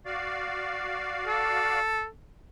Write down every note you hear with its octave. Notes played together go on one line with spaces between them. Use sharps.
F#4 D5 F5
A4